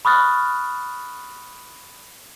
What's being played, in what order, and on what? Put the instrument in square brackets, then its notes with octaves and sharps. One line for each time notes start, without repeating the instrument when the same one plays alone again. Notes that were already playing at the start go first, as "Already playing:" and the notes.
[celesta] B5 C#6 D#6 F6 F#6 A6